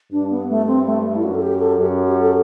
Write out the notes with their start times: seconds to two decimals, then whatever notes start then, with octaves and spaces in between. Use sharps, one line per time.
0.12 G2 D4
0.30 B3
0.49 A3
0.67 C4
0.86 A3
1.04 A3
1.15 E4
1.23 F#2 F#4
1.35 A4
1.42 G4
1.60 A4
1.78 F#2 G4
2.06 G4
2.21 A4